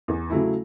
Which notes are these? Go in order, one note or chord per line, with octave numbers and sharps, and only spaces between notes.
E2
C#3 F#3 A3 E4